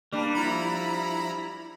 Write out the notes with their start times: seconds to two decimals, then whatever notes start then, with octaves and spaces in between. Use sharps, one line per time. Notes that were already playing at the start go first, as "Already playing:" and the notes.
0.12 G3 A#3 D4
0.35 F3 E4 A#5 B5